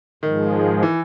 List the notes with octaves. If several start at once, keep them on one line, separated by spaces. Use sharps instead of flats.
G#2 D#3 F3 G#3
E3